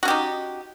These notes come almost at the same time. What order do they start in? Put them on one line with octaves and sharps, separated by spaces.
F#4 C#4 G4 D#4